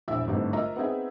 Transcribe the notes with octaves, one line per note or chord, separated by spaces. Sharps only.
E1 A#1 E4 E5 E6
G#1 G2 D3 A3 D#4 E4
F4 A#4 D#5 E5 A#5 E6
B3 C4 D#4 G#4 E5